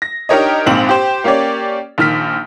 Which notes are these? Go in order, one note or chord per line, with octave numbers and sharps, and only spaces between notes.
A#6
D4 D#4 G4 A#4 C#5 D#5
A#1 G#2 C4 F5 F#7
G4 C5
A#3 C#4 G4 C#5 D5
A#1 D#3 F6 B6